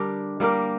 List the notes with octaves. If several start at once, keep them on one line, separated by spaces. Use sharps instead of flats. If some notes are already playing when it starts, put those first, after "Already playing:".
Already playing: D3 G3 D4 G4 A#4
G3 A#3 G4 A#4